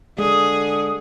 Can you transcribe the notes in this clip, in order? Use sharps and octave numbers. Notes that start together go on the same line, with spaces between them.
D3 G#3 G#4 D#6